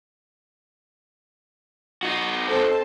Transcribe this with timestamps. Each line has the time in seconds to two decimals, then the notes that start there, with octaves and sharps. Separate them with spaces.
2.03 D#4 F#4
2.48 C4 A4 C5 A5